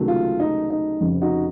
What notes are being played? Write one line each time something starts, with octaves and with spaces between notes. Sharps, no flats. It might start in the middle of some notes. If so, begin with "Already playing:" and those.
Already playing: C#2 C3 D#3 F#3 A3
F4
D#4
D#4
F1 F2 C#3
D#4 F#4